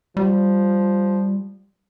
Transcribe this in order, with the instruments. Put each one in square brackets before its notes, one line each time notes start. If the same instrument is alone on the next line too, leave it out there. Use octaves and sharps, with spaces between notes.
[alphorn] F3 [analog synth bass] G3